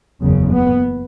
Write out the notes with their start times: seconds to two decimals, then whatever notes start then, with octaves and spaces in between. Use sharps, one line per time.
0.20 F#1 E2 C#3
0.52 B3